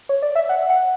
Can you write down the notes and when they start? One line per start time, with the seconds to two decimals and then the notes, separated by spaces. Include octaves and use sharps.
0.09 C#5
0.22 D5
0.35 E5
0.49 F#5
0.69 F#5